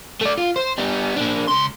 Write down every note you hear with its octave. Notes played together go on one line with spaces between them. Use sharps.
A3 D5
F4
C5
G3 B3
A#3 D4
C#2 C6